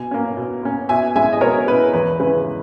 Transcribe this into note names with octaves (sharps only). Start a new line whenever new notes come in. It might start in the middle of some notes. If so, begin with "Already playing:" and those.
Already playing: B2 G#5
A#3 C#4
B2
A#3 C#4
B2 E5 G#5
G#3 C#4 E4 E5 G#5
D#5
B2 A#4 C#5
G#3 C#4 E4 B4
E2 B4
C#3 G#3 C#4 E4 B4